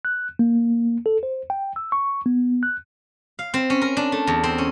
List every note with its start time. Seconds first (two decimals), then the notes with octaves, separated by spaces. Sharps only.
0.05 F#6
0.39 A#3
1.06 A4
1.23 C5
1.50 G5
1.76 E6
1.92 C#6
2.26 B3
2.63 F#6
3.39 F5
3.54 C4
3.70 C#4
3.81 A#4
3.97 D4
4.12 A3
4.27 E2
4.44 C4
4.58 C#4